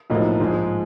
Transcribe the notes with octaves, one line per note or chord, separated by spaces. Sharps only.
B1 A2 F3 A#3 D#4
G#2 F3 G#3